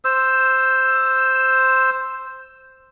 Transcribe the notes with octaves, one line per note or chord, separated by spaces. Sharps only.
C5 E6